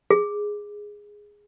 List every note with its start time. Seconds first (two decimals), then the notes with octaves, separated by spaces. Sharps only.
0.10 G#4